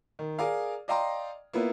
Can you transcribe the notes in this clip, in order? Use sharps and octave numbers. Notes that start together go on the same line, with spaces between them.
D#3
G#4 A#4 D5 F5
D5 D#5 F5 G5 A#5 C6
A#3 B3 E4 F4 B4